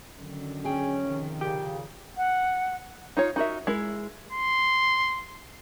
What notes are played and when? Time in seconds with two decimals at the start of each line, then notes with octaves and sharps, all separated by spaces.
0.17 F#2 D3 D#3
0.65 C#4 G#4 G5
1.04 C3 D#3 F3
1.41 A#2 C#3 G4
2.17 F#5
3.17 D#4 F4 C#5
3.36 D#4 F#4 A#4 E5
3.67 G#3 E4 A#4
4.32 C6